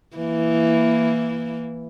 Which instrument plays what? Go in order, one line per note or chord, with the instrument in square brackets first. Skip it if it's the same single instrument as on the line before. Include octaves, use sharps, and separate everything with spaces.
[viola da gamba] E3 A#3 E4